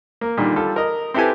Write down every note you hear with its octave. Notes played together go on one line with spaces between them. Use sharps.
A#3
A#2 D3 D#3 G3
G3 F4 A4
A#4 D#5
C4 E4 G4 A4 B4 G#5